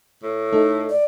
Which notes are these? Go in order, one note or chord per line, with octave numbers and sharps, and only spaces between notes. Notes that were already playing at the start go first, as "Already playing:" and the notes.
A2
A3 D#4 A4
D5